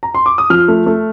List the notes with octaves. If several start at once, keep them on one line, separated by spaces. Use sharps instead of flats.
A#5
C6
D6
D#6
F3 F6
A3
A3